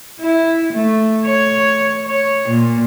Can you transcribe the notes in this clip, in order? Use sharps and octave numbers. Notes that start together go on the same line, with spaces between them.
E4
A3
C#5
C#5
A#2